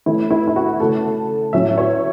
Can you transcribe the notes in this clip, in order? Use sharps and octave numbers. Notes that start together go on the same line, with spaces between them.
E3 A3 C#4 E4
E4
E4
F#4
C#3 A3 C#4 A4
A2 F#3 C#4 E5
C#5